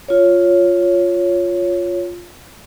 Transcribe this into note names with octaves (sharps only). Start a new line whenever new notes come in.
F4 C#5